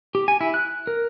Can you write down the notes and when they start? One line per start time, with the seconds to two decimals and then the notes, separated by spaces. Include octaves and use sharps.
0.15 G4
0.28 G#5
0.41 E4
0.54 F#6
0.87 A#4